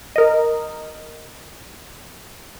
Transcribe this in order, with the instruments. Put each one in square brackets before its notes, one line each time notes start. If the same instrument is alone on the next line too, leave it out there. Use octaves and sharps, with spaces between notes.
[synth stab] A#4 D#5